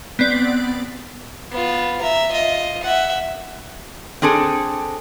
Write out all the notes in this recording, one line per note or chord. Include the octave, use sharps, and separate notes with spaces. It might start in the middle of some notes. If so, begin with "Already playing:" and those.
B3 C4 D5
B3 F4
E5 A#5
F4 D#5
E5 F#5
C4 D4 G#4 A4